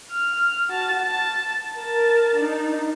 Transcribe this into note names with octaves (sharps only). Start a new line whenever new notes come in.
F6
F#4 A5
A5
A#4 A5
D4 D#4